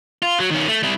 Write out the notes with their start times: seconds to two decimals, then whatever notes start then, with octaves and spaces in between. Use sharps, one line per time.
0.22 F4
0.40 F#3
0.51 D#3 C#4
0.68 A3
0.83 G3 E4